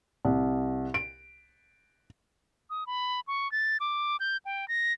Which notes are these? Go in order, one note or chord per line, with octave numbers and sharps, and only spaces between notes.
C2
D7
D#6
B5
C#6
A6
D6
G6
G5
A#6